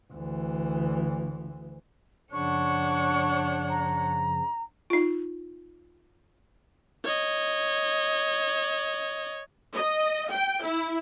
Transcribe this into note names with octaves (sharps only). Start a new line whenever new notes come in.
D2 E3
F#2 C#3 F3 D4 C#5 F#5 C#6
A#5
D#4 F4
C#5 D#5
D#5
G5
E4